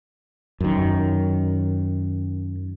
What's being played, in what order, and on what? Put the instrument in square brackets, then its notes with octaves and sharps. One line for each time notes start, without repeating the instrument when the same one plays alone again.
[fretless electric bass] F#2 D#3